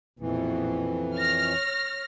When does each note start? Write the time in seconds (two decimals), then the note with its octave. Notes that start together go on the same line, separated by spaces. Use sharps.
0.20 A#1 F2 B2 E3
1.16 C#5 F6 A#6